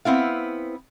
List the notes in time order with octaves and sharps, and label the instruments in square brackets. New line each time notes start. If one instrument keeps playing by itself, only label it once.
[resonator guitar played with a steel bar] B3 C4 E4 F5